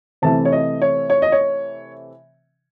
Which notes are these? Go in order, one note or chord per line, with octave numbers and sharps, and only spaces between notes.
C3 E3 A3 C4 A5
C#5
D#5
C#5
C#5
D#5
C#5